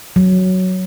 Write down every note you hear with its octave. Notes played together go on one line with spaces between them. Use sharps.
F#3